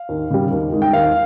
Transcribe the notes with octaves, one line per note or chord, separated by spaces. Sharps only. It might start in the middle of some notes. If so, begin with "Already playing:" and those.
Already playing: F5
D#2
C#3 G3
D#2
D#3 G#3
G5
D#2 F5